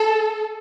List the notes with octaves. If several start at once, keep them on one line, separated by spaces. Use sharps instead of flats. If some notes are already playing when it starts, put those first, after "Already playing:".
Already playing: A4